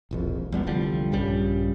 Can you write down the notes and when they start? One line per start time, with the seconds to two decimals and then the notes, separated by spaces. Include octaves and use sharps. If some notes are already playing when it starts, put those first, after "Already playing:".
0.11 E1 A#1 F2
0.52 E1 G3 B3
0.67 C2 D3 F3 G3
1.12 A#1 G2 C#3 G3